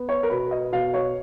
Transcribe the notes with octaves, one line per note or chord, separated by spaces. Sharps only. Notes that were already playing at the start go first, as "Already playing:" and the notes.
Already playing: B3
C#5
A#4
B2 B4
D#5
B2 F5
C#5